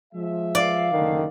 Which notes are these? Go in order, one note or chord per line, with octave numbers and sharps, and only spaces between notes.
F3 G#3 E5
D5 F5
F#1 D2 D3 D#3